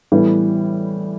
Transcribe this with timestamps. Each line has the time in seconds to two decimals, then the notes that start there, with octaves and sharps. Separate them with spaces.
0.12 A2 E3 G3 B3